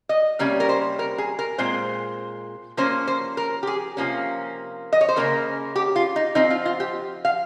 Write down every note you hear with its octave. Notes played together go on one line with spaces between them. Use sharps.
D#5
C3 G3 A#3 C#4 C#5
A#4
C5
A#4
G#4
A#4
A#2 G#3 C4 C5
F3 A#3 C#4 C5
C5
A#4
G4
G#4
C3 F3 A#3 C#4
D#5
C#5
C5
C#3 F3 A#3 C#4 A#4
G4
F4
D#4
F3 C4 D#4
F4
F4
G4
F5